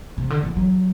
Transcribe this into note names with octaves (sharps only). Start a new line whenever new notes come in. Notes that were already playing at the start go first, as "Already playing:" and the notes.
C3
D3
E3
F#3